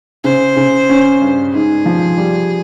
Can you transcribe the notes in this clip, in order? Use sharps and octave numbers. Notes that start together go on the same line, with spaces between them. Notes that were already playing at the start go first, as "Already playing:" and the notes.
C#3 C5
C#3
C#4
G2
G#2 G#4
F3
G3